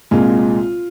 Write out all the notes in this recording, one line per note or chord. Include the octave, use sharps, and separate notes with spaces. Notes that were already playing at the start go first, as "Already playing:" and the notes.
C2 A#2 G#3 F4